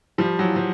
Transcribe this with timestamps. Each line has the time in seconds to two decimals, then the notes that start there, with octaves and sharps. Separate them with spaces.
0.18 F3 G3
0.39 E3 F#3
0.56 F3